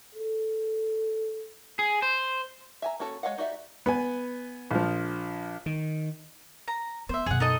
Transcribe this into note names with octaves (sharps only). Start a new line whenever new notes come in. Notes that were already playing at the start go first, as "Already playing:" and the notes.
A4
G#4
C5
E5 G#5 A#5
A#3 C#4 F#4 A4 C#5
G#3 C#5 D#5 F5 F#5
D#4 F#4 G4 D5 E5
B3 B4 G#5
A#1 F3
D#3
A#5
B3 C5 E5
F#2 B2 G#4 F#5
D#4 A4 D#5